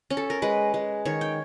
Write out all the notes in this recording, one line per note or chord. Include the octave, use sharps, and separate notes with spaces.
C#4
A4
A#4
G#3 B4
G#3
D#3 C#5
G5